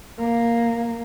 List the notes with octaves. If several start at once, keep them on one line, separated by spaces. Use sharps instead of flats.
A#3